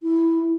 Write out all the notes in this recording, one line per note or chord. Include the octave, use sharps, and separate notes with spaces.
E4